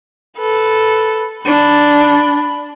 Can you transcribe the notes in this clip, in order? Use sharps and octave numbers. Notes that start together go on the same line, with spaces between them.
A4 B4
D4 B5